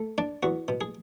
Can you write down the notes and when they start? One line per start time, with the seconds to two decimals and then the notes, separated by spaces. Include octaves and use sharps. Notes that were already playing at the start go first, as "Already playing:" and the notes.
Already playing: A3
0.18 D4 D5
0.43 E2 F#4
0.68 B2
0.81 G#4